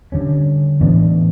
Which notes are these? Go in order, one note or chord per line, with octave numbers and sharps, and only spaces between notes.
D3 G3 C#4
A2 E3 B3 D4